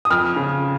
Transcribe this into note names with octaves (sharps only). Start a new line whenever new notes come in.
D#6
F2 F6
C#3